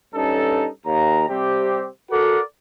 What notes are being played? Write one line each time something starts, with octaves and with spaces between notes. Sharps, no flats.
G2 C#4 D#4 A4
D#2 A#5
C3 G3 C4 G4
F#4 A4 A#4 D5 F#5